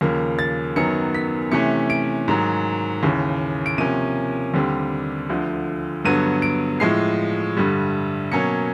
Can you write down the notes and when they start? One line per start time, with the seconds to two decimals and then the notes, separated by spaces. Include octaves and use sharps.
0.01 D#2 C#3 F3 A#3
0.39 A6
0.76 F#2 D#3 F#3 B3 C#7
1.15 B6
1.52 C3 E3 A3 C#4 C#7
1.90 D7
2.28 G#2 D#3 F#3
3.03 D#2 C#3 E3
3.66 D7
3.78 C3 F3 A#3 C#4 D#7
4.54 D#2 D3 G3 C4
5.30 D2 D3 F3
6.04 G2 D3 F#3 B3 D#7
6.42 D7
6.80 A2 F3 G#3 C7
7.57 G2 D3 G3
8.32 B2 F#3 A#3 C#4 C#7